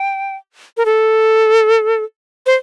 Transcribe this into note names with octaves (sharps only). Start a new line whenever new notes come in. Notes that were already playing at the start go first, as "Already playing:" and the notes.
Already playing: G5
A#4
A4
C5